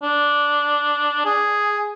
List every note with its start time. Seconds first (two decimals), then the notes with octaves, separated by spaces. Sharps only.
0.03 D4
1.25 G#4